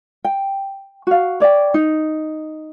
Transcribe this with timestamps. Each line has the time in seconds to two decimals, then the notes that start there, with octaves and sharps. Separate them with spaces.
0.24 G5
1.07 F#4 F5
1.40 C#5 D5 E5 G5
1.74 D#4